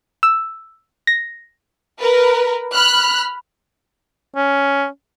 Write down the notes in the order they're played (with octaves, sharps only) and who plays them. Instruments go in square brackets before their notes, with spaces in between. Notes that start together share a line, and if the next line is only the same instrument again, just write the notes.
[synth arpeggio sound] E6
A#6
[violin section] A#4 B4
B5 F6 F#6
[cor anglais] C#4